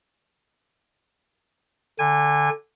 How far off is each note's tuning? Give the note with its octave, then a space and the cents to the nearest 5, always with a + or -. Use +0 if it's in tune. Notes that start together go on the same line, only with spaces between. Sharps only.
D3 +0 G#5 -25